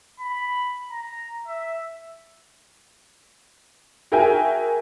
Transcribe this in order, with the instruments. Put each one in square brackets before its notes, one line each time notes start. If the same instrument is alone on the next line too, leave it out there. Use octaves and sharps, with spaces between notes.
[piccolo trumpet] B5
A#5
E5
[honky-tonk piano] F#4 G#4 A#4 E5 G5 G#5